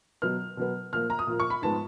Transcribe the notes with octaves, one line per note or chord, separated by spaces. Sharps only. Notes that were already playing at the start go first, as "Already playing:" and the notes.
B2 F#3 B3 F6
B2 F#3 B3
A#2 F3 A#3 F6
A#5
D#6
A#2 F3 A#3
C#6
B5
G#2 F3 G#3 B3 A5